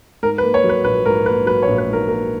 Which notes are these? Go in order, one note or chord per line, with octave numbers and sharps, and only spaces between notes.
G#2 A#4
B4
A#3
C#5
F#3
B4
A#1 B4
G#2 A#4
A#3 B4
F#3 B4
C#5
A#1
B4
G#2 A#4
A#3 A#4